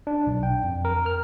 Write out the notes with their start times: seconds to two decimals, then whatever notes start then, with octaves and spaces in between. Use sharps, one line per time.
0.07 D4
0.27 B1
0.43 G5
0.63 F2
0.85 A#4
1.06 F6